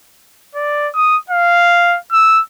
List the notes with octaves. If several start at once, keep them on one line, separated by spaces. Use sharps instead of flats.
D5
D#6
F5
E6